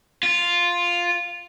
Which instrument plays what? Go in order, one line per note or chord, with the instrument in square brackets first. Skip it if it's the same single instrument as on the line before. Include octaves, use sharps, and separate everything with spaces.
[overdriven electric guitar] F4